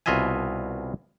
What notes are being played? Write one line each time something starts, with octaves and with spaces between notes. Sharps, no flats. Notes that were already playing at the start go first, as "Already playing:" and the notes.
C2 B2 F4 D#5 E5 G#5